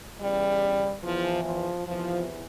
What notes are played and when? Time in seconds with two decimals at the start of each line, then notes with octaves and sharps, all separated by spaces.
0.20 E2 C#3 E3 G3
1.03 E2 E3 F3
1.44 F3
1.86 E2 C3 E3 F3